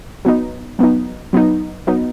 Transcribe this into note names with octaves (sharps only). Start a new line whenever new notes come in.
F#3 B3 D#4
F#3 B3 D#4
F#3 B3 D#4
F#3 B3 D#4